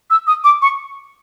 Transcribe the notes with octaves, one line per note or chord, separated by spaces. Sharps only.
E6
D#6
D6
C#6